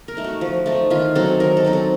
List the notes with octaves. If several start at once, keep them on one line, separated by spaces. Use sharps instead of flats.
A#4
A3 D#4
F#4
F3
A3 D#4
D#3 F4
F#3 C4 D#4 A4
D#3 A#4
A4
F#3 C4 D#4
A4